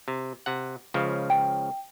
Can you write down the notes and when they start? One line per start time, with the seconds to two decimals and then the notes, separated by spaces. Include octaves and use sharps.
0.08 C3
0.46 C3 F#5
0.94 C#2 C#3 F3
1.30 G5